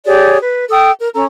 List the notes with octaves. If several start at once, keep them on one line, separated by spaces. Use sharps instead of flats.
G4 G#4 C#5 D5
B4
A4 G5 D#6
A#4
C#4 A4 A#5